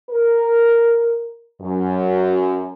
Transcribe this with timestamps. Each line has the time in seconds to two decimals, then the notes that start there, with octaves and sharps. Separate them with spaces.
0.11 A#4
1.60 F#2